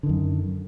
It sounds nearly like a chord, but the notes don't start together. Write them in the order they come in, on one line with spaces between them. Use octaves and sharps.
D3 D#3 F#2